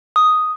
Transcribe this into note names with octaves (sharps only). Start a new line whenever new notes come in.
D#6